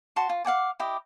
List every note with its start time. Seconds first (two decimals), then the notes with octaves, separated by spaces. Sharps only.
0.16 F#4 A5 C6 C#6
0.29 F4
0.45 F5 F#5 G#5 D6
0.80 E4 G4 D#5